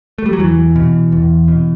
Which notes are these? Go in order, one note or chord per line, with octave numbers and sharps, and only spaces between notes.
A3
G3
F#3
E2 E3
B2
E2
B2